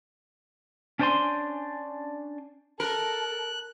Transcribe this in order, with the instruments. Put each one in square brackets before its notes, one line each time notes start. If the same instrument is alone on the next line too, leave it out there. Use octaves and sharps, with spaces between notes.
[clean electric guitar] C#4 D4 C5 D5 G#5 C6
[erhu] A4 [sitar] A#4 [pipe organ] F#6